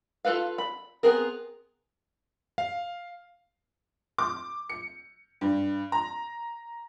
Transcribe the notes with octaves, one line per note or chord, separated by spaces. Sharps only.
F4 G#4 A4 B4 F5
B5
B3 C4 G#4 A#4
F5
D6
C#7
G2
A#5